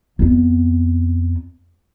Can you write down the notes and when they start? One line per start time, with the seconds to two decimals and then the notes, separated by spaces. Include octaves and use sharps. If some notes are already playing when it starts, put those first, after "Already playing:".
0.19 F2 B3